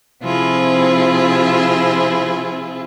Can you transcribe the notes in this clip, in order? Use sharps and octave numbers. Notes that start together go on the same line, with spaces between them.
C3 F3 C4 E4 F4 G#4